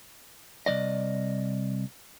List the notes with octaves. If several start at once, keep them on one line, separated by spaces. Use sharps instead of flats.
C2 E3 D5 D#5